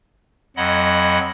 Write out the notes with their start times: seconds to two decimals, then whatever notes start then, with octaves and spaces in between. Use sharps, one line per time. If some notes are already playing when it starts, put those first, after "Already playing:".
0.57 F2 F#3 D#5 F#5 B5